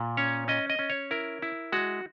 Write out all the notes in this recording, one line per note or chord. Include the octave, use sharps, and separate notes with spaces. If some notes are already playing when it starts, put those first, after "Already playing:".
Already playing: A#2
C#4 C#5
C#4 D#5
D#5
C#4
C#5
E4 A#4
E4
G#3 F#4